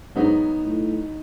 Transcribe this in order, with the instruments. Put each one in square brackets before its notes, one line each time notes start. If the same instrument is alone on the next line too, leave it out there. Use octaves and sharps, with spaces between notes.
[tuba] G#2 [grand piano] F#3 B3 D#4
[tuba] A2